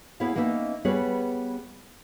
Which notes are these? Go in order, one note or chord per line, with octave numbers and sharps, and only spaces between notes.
B3 E4 G#4 C#5 F5
A#3 B3 C#4 D#4 C5 E5
G3 B3 G#4 B4 C#5